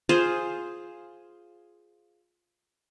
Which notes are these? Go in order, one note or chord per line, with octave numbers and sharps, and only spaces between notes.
F4 G#4 C5